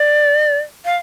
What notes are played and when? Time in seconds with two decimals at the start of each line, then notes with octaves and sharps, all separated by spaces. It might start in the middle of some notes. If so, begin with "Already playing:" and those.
Already playing: D5
0.85 F5